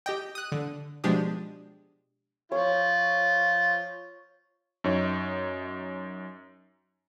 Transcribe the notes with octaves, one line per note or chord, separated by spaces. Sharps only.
G4 D#5 G5
D#6 F#6
D3
B2 F3 G#3 D4 G4 D#6
F3 F4 C#5
F#2 D#4 C#5